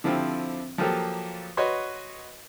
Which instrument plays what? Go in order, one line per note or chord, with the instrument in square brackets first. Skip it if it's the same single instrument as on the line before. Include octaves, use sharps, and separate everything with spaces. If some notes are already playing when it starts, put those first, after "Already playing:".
[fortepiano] D3 F3 C4 E4 F4 G4
F3 F#3 A#3 F4 G4 A4
F#4 B4 C#5 D#5 C6